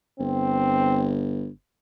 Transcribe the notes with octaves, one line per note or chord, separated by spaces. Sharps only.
G1 C4